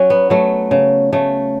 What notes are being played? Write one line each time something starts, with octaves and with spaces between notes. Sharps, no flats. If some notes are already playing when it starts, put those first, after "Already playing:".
Already playing: F#3 C#4
B3
F#3 A3
C#3
C#3 A3